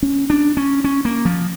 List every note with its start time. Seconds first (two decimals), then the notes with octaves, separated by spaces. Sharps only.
0.03 C#4
0.30 D4
0.57 C#4
0.84 C#4
1.05 A#3
1.25 F3